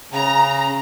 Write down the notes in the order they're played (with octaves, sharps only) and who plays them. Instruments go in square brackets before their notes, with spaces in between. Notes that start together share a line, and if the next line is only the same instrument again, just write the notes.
[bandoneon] C#3 [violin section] A#5